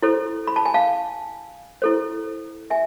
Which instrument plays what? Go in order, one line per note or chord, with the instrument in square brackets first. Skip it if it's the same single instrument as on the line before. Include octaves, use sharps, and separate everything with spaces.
[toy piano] E4 A4 C5
B5
A5
G#5
F5 A5
E4 A4 C5
E5 G#5